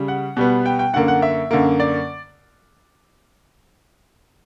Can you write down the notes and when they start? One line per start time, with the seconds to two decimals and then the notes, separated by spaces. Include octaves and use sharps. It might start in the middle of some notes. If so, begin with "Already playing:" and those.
Already playing: C#3 G3
0.08 F#5
0.37 B2 G3 B3
0.66 G5
0.79 G5
0.93 F#2 D3 A#3 F#5
1.08 F#5
1.22 E5
1.51 F#2 D3 A#3
1.80 D5